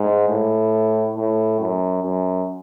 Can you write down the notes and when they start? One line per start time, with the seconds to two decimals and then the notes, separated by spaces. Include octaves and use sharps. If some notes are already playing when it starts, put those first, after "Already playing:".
Already playing: G#2
0.29 A2
1.16 A2
1.60 F#2
2.03 F#2